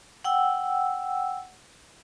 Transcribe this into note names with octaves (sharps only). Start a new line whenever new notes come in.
F#5 G5 E6